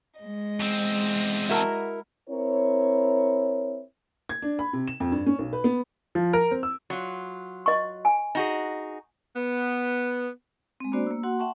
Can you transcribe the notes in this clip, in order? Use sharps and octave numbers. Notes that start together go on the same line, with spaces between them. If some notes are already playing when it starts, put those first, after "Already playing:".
G#3 D#5
E2 C4
E4 F#4 A#4
C4 E4 A#4 C#5
G#6
D4
B5
C3
E7
F2
G2
C#4
B1
B4
B3
F3
A#4
C4
E6
F#3 F4
D#5 C#6
G#5
D#4 F#4 G#4
B3
G#3 C4
A#3 B3 D4 F#4 C5 D5
A#3 E6
A#3 F#4 F#5 C6
E5 F#5 G5 A5 C6 C#6